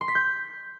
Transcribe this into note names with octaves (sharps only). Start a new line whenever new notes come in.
C6
B6
G6